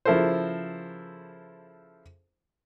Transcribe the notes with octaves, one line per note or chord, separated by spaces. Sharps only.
C#3 F3 E4 A4 A#4 C5